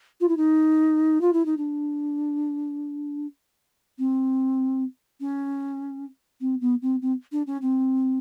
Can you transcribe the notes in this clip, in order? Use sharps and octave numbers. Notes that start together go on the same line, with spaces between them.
F4
E4
D#4
F4
E4
D#4
D4
C4
C#4
C4
B3
C4
C4
D4
C#4
C4